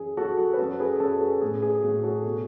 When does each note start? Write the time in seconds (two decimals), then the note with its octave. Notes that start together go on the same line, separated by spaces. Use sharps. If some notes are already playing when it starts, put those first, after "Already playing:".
Already playing: F#2 E3 G#4
0.17 F#3 F#4 A4
0.53 B4
0.59 F#2 F#4 A4
0.80 G#4 B4
1.00 F#2 F#4 A4
1.21 G#4
1.41 A2 G#4
1.62 G#4
1.83 A2 F#4
2.03 F#4 A4
2.24 B2 F#4